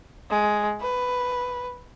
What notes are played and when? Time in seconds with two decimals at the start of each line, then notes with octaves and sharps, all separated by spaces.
0.30 G#3
0.81 B4